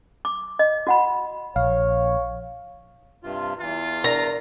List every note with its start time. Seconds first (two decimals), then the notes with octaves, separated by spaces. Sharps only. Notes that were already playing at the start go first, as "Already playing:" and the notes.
0.25 D6
0.59 D#5
0.87 F#4 F#5 B5
1.56 A#1 C#5 F5
3.24 G2 C3 F4
3.60 E2 E3 F4
4.04 D4 A#4 D5 A#5